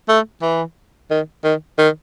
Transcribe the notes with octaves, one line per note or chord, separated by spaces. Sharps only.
A3
E3
D#3
D#3
D#3